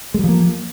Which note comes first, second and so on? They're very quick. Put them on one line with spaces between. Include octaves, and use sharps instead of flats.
G#3 G3 F3 A#3